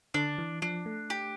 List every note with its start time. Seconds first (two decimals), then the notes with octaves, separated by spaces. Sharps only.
0.14 D3 D4
0.38 E3
0.62 F3 D4
0.86 A3
1.10 G4